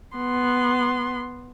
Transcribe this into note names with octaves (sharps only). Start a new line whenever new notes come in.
B3 C6